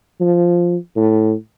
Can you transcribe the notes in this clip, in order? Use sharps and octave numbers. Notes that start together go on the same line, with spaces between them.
F3
A2